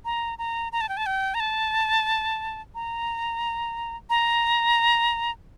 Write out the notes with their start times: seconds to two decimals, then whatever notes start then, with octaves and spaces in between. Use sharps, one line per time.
0.05 A#5
0.38 A#5
0.72 A#5
0.81 A5
0.89 G5
0.97 A5
1.06 G5
1.34 A#5
1.40 A5
2.75 A#5
4.10 A#5